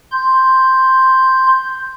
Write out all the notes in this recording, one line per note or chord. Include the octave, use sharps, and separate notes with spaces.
C6 G6